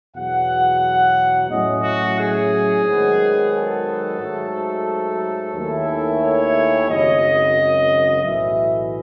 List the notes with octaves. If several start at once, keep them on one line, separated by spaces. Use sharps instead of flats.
E2 B2 F#3 F#5
A2 F#3 C#4 E4 D#5
F#4
G#4
G#2 D#3 F#3 B3
A4
G#2 F#3 A3
D#2 D#3 A3 C#4 E4
C#5
G#1 F#2 C#3 F#3 D#5
B1 A2 E3 E5